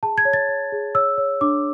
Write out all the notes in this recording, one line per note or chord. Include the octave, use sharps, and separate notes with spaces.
G#4 A5
G#6
C#5
A6
C#5
G#4
C#5 E6
C#5
D4 D6